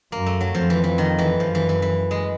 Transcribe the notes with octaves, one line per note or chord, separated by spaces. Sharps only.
F#2 A#3
A3
F#3
F2 F3
E3
E3
D#3
E3
F#2 F3
E3
E3
E3
G#3